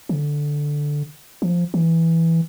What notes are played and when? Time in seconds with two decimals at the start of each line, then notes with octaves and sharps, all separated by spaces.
0.09 E3
0.13 D3
1.42 F3
1.74 E3